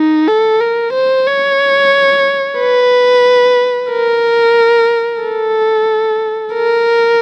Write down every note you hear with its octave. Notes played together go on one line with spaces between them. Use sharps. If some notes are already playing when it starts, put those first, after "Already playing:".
Already playing: D#4
A4
A#4
C5
C#5
B4
A#4
A4
A#4